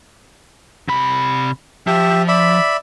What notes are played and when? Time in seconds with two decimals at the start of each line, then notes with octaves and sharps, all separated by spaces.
0.88 C3 B5
1.87 F3 G4 E5
2.28 D5 E5 B5